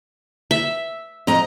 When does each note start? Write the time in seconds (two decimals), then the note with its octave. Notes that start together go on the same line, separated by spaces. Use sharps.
0.51 E5
1.27 F2 D#5 A#5